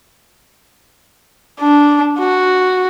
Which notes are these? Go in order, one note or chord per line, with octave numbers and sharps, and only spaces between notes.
D4
F#4